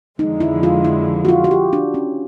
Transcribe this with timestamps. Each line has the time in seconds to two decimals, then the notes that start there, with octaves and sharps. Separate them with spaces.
0.19 F2 D3 F3 G#3 D#4
0.40 E4
0.63 F4
0.84 E4
1.25 F#4
1.29 F4
1.44 F#4
1.51 G4
1.73 D4
1.94 C#4